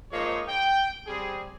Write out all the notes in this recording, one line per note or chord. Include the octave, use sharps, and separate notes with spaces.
F3 G#3 A#3 D#4 C5 C#5
G5
G3 C4 G#4